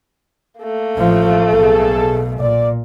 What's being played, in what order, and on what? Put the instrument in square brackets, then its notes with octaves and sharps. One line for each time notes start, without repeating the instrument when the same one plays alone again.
[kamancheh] A3 A#3
[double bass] A1 F3
[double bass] B1 B2 [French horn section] G#4 A4
[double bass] A#2 [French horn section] D5